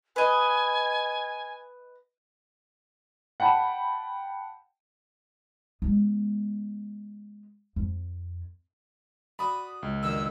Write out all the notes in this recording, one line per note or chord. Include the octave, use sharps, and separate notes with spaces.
B4 D#5 G#5
F#5 G5 A5 B5
G#3 B3
F2
F#4 D5 B5 D#6
C#2
F#2 D3 D#3 E6